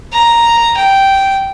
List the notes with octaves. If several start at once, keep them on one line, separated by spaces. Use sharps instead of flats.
A#5
G5